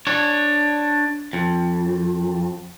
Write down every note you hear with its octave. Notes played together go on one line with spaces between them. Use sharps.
D4 C#5
F2